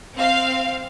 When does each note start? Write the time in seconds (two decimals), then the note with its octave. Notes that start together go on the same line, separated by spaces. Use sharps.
0.15 C4 F5